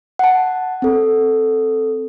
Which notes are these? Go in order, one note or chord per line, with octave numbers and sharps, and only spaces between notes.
F#5 A5
C4 A4